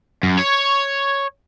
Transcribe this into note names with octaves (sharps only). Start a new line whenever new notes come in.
F#2
C#5